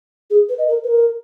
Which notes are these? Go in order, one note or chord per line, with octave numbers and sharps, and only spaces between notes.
G#4
B4
D#5
A#4
B4
A#4